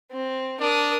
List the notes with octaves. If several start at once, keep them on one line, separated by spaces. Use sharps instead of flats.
C4
D4 A#4 D#6